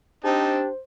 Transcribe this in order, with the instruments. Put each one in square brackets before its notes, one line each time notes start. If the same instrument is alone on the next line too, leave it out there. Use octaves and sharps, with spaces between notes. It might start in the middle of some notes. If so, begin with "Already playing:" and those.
[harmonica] C4 D#4 A5 [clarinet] D4 [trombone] G4 [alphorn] C5